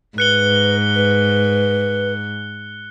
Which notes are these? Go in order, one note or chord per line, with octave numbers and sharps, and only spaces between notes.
G#2 B4 F#6 C#7 G7
B4